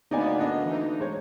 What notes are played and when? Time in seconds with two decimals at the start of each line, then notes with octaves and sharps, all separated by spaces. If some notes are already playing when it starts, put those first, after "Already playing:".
0.11 D2 A#3 B3 D#4 D5 G#5
0.39 D4 D#5
0.65 E3 D#4
1.00 G#3 C5 C#5